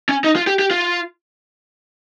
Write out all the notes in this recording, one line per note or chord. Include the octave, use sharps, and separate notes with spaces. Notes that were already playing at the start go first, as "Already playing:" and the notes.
C#4
D#4
F4
G4
G4
F4